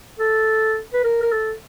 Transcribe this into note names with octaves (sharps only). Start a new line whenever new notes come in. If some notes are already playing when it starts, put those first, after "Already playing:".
A4
B4
A#4
A#4
A4